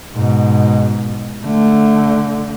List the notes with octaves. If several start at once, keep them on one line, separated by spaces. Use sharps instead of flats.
G#2 B2
D3 A3